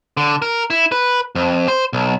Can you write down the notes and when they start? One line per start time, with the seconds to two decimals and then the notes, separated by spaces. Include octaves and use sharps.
0.17 D3
0.42 A#4
0.70 E4
0.92 B4
1.35 F2
1.68 C5
1.93 B1